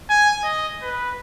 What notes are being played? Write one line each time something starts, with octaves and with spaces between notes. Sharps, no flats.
G#5
D#5
B4